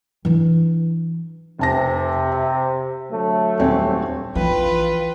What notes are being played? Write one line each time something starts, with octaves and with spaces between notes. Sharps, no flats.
E3 D4
F1 C3 A5 A#6
E5
D3 F#3 A3
D#1 C4 C#5
A#1 E3 F4 B4 G5 B5